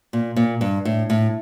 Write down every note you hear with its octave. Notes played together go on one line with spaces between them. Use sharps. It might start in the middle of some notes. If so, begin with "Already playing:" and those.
A#2
A#2
G2
A2
A2